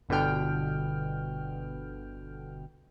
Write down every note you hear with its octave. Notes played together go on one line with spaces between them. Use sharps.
G1 B2 D3 B3 G5 F6